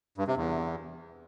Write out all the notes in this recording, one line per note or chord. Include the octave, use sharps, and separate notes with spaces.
G2
C3
E2